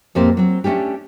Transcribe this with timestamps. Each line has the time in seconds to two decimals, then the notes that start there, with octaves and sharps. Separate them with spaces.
0.15 F2 A2 A#3 C4 G4 C5
0.37 F#3 C4
0.64 A3 A#3 C#4 D4 G4